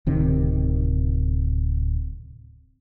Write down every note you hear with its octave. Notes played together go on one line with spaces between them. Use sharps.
D1 C3 D#3